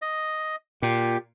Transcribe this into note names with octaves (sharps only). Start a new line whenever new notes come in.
D#5
A#2 G4